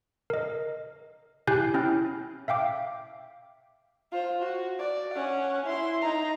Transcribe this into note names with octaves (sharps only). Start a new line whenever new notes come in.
A#4 D#5
E4 G4 G#5 F#6 G6 C7
C#4 E4 G5 F6
E5 F5 G5 D6
F4 C5
F#4
D5
C#4 F#5
E4 C6
D#4 A#5